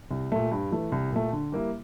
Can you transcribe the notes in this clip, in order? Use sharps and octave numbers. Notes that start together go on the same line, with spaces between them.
C2
A#2 A3
G2
E3 A3
C2
A#2 A3
D3
G3 A#3 E4